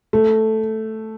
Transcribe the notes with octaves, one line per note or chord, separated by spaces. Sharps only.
A3